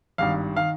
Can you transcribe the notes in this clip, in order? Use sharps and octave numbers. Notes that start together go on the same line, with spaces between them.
G#1 G2 D#3 F5
D#3 F5